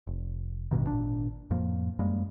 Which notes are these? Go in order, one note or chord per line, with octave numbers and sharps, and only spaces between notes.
F1
A1 G2 B2 D#3
G#1 A#2 D4
F2 A2 F3 A#3
F#2 G3 G#3 A#3